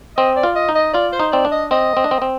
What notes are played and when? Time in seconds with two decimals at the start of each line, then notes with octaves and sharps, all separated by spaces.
0.17 C4 D#5
0.36 D5
0.43 F4
0.55 D#5
0.69 D#4
0.75 D#5
0.94 F4 D5
1.13 C5
1.20 D#4
1.32 C4 D5
1.45 D4
1.51 D#5
1.71 C4 D#5
1.97 C4
2.04 D4
2.11 C4
2.22 C4